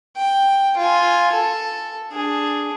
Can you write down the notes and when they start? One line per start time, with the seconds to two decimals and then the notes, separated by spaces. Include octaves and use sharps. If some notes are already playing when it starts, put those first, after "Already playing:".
0.17 G5
0.77 F4 G#5
1.32 A4
2.11 D4 G#4